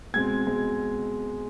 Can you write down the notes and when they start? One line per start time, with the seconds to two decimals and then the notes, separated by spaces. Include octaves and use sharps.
0.14 B2 G#3 C4 G#6
0.46 B2 G#3 C4